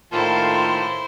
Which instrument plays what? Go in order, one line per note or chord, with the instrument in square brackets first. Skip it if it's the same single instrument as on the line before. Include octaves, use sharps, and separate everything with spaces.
[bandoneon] A2 D#3 A#3 [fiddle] E4 C5 [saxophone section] F4 [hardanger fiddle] A4